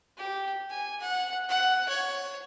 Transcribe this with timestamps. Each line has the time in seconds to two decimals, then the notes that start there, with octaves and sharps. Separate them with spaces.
0.17 G4
0.70 G#5
1.00 F#5
1.49 F#5
1.88 C#5